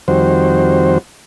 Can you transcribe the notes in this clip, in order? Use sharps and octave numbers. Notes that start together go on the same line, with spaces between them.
F2 D#3 G3 C4 F#4 C5